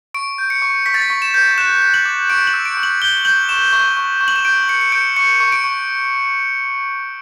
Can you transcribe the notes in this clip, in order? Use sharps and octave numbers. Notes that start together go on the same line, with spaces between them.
C#6 D7
G6
C#7
C#6
C#6 B6
A6
B6
C#6
E7
G6
F#6 E7
F#6
F#7
D6
C#6 D7
F#7
E6
D7
C#6
F#7
G6 G7
G6 F#7
C#6 E7
C#6
C#6
C#6
F#7
E7
G6 D7
G6 C#7
C#7
G6 D7
C#6 C#7
C#6
D7
C#6